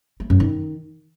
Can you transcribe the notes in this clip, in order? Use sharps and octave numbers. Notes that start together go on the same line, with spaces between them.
A3
F#2
D#3